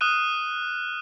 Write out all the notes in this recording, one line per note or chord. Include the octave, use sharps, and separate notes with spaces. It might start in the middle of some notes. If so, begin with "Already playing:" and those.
D#6 F6 F#6 D#7